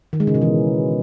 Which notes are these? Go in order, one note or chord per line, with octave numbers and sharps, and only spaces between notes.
D#3
G#3
C#3
B2
E3